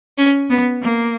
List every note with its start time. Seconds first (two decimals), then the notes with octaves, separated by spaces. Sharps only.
0.17 C#4
0.50 B3
0.82 A#3